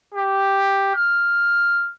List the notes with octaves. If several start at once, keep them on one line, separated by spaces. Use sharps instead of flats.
G4
F6